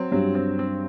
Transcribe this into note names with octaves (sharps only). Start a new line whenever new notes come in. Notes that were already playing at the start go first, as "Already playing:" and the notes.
Already playing: F#3 C4
G2 F#3
C4
C4